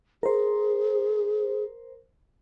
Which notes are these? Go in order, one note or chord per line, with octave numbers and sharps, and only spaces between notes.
G#4 A#4 C5